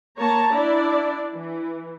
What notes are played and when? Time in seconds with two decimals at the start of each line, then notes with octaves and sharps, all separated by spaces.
0.18 A#3 C#5 A5 A#5
0.53 D4 E4 D5
1.35 E3